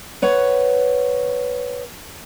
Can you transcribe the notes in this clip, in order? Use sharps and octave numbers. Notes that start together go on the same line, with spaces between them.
B4 C#5 F#5